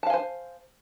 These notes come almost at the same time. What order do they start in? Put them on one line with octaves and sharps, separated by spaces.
A5 F5 G#5 C5